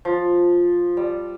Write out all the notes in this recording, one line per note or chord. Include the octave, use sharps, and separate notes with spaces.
F3
G3